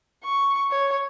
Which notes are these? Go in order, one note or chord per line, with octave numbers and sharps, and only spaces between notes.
C#6
C#5